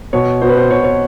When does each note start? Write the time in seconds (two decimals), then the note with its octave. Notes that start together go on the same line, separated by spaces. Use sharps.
0.13 B2 C#5
0.42 B2 C5
0.49 B4
0.57 C5
0.71 B2 C#5
0.84 C#5